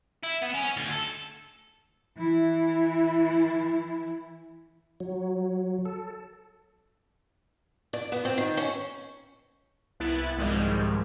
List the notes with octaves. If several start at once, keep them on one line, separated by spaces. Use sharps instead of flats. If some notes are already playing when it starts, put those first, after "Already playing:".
E4
B3
C#4
D2
A4
E3 E4
F#3
A4
D5
B3
C4
D#3
C#4
C2 B3 E4 F#6 A6
C2 G#2 D#3 F3 G3 G#3